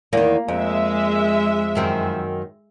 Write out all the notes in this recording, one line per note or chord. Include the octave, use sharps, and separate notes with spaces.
E2 D#3 A#3
F2 G#3 E5
F#2 D#3 C4